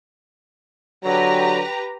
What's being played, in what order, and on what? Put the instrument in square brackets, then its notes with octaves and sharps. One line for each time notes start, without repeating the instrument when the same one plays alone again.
[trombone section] D3 F#3 [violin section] G4 B4 A#5